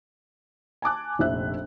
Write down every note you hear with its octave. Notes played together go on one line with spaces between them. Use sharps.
G#5 A5 D6 F#6
F1 A#1 E5 F#6